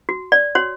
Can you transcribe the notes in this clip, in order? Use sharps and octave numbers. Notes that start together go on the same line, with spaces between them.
F#4
D5
F#4 C#5